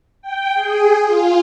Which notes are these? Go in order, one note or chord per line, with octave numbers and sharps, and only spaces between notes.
G5
G#4
F4